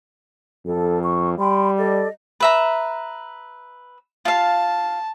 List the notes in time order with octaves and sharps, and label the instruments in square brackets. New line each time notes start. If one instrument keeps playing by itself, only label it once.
[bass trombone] F2 [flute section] A4
[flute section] C#6
[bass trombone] G3 [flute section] G5 B5 C6
[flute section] A4 D5 D#5
[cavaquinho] B4 E5 A#5
[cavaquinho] F4 F5 [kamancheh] A5